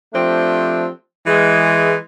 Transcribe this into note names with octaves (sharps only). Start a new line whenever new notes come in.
F3 A3 C4 D4 G4
E3 G#3